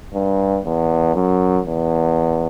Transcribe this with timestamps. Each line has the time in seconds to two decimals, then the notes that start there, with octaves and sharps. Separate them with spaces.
0.13 G2
0.64 E2
1.15 F#2
1.66 E2